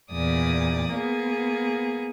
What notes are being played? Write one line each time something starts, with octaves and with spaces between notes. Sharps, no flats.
E2 A#2 D5 D#6
A#3 B3 G#4